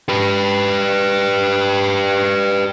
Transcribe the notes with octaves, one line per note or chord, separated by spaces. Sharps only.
G4 B4